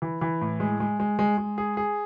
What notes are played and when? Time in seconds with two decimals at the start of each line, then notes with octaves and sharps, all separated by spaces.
0.02 E3
0.21 E3
0.41 A2
0.60 G#3
0.80 G#3
1.00 G#3
1.19 G#3
1.38 G#3
1.58 G#4
1.77 G#4